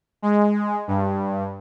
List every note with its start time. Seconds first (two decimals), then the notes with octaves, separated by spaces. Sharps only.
0.22 G#3
0.88 G2